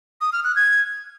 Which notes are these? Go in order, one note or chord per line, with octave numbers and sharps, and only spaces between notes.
D#6
F6
F#6
G#6